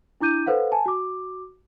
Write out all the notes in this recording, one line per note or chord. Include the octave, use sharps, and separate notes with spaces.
D4 E4 D6 G6 D#7
A4 B4 C5 F5 F#5
G#5 A5
F#4 D6